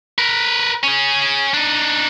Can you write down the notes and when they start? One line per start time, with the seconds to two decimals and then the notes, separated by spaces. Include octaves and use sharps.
0.18 A#4 B4
0.83 C#4 G#4
1.54 D4 D#4